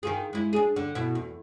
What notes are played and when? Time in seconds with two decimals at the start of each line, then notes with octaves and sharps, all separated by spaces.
0.03 D#3 F4 G#4
0.33 G#3 E4
0.53 D4 G#4
0.76 D3
0.95 B2 E4
1.15 E2